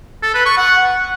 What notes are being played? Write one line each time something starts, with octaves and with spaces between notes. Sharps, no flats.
A4
B4
C#6
F#5